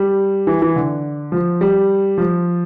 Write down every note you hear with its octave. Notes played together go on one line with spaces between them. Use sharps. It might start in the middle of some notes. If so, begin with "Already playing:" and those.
Already playing: G3
E3
E3
D3
F3
G3
F3